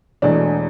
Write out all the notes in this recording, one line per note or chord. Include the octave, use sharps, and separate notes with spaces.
E1 E2 B2 A3 D4